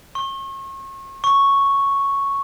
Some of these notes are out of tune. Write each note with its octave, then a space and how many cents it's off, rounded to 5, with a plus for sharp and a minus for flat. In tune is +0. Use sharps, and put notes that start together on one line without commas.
C#6 -40
C#6 +0